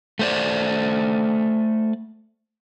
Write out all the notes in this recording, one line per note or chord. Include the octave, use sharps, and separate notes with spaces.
A3 C5 D5